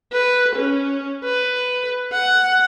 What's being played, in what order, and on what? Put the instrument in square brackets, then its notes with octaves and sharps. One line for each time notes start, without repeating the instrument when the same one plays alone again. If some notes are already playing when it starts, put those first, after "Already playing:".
[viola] B4
C#4
B4
F#5